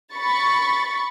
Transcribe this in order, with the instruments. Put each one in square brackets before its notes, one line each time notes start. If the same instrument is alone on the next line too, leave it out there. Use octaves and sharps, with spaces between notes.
[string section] B5 C#6 A6